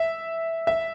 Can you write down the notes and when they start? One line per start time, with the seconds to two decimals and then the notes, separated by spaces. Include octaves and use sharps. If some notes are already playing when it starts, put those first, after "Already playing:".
Already playing: E5
0.67 E5